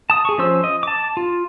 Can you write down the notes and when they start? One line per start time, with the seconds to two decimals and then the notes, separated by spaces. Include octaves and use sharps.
0.10 A5 D#6
0.25 G#4 C#6
0.38 F3 C#4 C5 C6 E6
0.64 D#5
0.83 A5 D6
1.17 F4